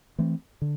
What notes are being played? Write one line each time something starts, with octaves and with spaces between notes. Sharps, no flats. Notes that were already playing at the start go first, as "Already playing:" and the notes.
E3 A3 C4
D3